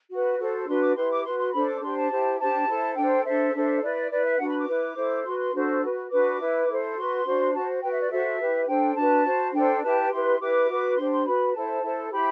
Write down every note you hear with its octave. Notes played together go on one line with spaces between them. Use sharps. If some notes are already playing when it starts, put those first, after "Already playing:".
F#4 B4
F#4 A4 C5
D4 F#4 B4 C6
D6
E4 G4 B4 C6
D6
F#4 B4 C6
C6
D4 A4 C5 B5
D6
D4 G4 C5 C6
A5
E4 G4 C5
D4 G4 C5 A5
E4 A4 C5
D4 A4 C5 G5
D4 A4 C5 E5
D4 A4 C5
E4 B4 D5
E4 B4 D5
E5
D4 F#4 B4 F#5
B5
D6
E4 B4
E4 A4 C5
F#4 B4 C6
C6
D4 F#4 A4 C5
F#4 B4
D4 F#4 B4 D6
E4 B4
E4 A4 C5
F#4 B4 C6
D4 F#4 C5
F#4 C5 A5
F#4 B4 G5
E5
D5
F#4 A4 C5 E5
E4 G4 B4
D4 A4 C5 G5
D4 F#4 B4 A5
F#4 C5
D4 A4 C5 G5
E4 G4 B4 A5
E4 G4 B4 C6
E4 G4 B4 D6
F#4 B4
D4 G4 C5 C6
C6
F#4 B4 B5
E4 A4 C5 A5
E4 A4 C5
E4 G4 C5 B5